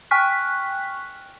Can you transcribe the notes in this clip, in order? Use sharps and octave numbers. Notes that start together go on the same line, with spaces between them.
G5 G#5 C#6 F6 F#6 B6